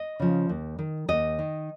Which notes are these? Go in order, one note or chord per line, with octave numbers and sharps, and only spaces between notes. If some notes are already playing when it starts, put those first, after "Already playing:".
Already playing: D#5
C#3 F3
D#2
D#3
D#2 D#5
D#3